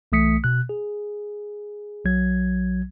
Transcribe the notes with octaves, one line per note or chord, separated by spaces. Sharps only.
B1 E3 A3 D#6 B6 C#7
B2 F#6
G#4
B1 F#3 G#6